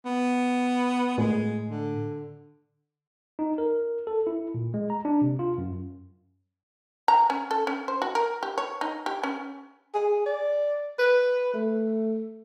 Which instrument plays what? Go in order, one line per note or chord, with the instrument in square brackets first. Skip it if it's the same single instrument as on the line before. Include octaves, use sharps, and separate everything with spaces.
[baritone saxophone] B3
[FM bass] A2 [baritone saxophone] G#3
[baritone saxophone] D3
[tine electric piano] D#4
A#4
A4
E4
A#2
G#3
A#5
D4
C3
F4
F#2
[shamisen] A#5
C#4
A4
C#4
C5
F#4
A#4
G4
C#5
D#4
G4
C#4
[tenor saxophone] G#4
D5
B4
A3